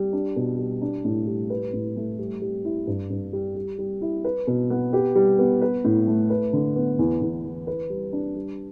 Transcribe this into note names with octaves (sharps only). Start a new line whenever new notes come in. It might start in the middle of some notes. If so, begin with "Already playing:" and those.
Already playing: G3
D4
B2
G3
D4
A2
G3
B4
A2
A3
G3
G3
E4
G2
G2
G3
G3
G3
E4
B4
B2
B3
G4
G3
B3
B4
A2
A3
B4
D3
B3
E2
E2
E3
B4
G3
D4
G3